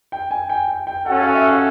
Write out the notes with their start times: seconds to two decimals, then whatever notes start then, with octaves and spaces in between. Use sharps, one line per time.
0.12 G5
0.31 G#5
0.50 G5
0.68 G5
0.87 G5
1.06 C#4 F#4 A4 F#5
1.20 F5
1.34 E5
1.49 F5